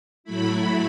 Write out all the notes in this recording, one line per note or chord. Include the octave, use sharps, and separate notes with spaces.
A2 F#3 A3 E4 B5